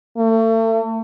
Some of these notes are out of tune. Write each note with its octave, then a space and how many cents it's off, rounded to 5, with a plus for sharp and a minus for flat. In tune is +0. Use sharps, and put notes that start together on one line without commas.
A3 +35